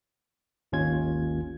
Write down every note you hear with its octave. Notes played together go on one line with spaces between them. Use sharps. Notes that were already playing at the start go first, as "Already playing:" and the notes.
G#1 D#2 C#4 F4 G#6